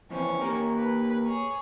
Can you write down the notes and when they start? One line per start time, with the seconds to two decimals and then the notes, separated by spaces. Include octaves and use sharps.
0.10 F2 E3 C4 C#4
0.41 A#3 G4 A#4
0.77 B4
1.26 G#4 C#5